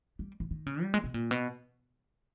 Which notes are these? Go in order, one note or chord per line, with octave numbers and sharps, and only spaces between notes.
G3
E3
D#3
C#3
G3
G#3
B2
A#2
B2